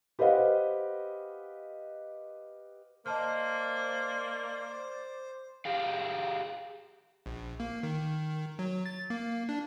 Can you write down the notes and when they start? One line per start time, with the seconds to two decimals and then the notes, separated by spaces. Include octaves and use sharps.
0.19 G4 B4 C5 D#5 F5 F#5
3.06 A#3 C5 D5 D#5 A5 F6
5.65 G4 G#4 F5
7.26 A#1
7.60 A#3
7.83 D#3
8.59 F#3
8.86 A6
9.10 A#3
9.49 D4